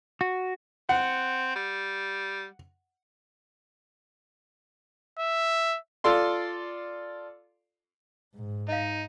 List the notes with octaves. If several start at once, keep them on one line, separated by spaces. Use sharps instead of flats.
F#4
C4 F#5
G3
E5
F4 A4 D5 C6
G#2
D#4 D#5 F5